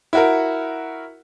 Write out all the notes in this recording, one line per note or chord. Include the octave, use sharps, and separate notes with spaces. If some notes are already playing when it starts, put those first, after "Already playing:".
E4 F#4 A#4